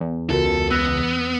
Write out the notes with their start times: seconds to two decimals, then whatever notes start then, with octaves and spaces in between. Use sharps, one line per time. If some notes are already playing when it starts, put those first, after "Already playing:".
0.01 E2
0.30 C#2 F4 F#4 A4 A#4
0.71 B3 E6 F#6 A#6